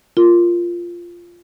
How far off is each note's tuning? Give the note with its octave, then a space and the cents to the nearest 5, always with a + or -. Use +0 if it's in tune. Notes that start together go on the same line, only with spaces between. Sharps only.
F4 -10 A#4 +0